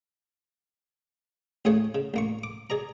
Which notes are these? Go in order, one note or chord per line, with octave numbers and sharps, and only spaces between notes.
A1 A2 G#4 C#5 F5
C#3
A1 A#3 C#6
D6
G#4 D5 A#5